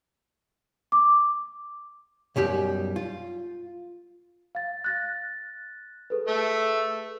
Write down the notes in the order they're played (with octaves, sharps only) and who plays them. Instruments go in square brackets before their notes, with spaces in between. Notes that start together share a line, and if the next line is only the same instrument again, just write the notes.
[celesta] D6
[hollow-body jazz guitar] B1 F#2 G3 G4
F4
[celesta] F5 A6
F#6 A6 A#6
G#4 A4 B4
[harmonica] A3 E5